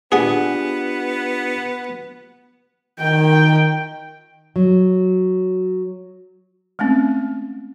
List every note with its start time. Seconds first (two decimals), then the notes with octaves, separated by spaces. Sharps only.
0.12 B3 D4 F4 G4 G#4 F#5
3.00 D#3 G5
4.56 F#3
6.79 G#3 A3 C4 C#4